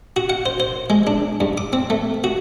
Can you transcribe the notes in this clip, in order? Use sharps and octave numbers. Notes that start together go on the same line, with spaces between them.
F#4
F#5
C5
C5
G#3
D4
G2
D6
C4
A3
F#4